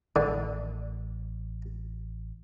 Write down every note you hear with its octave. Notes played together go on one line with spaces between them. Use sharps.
A1 D3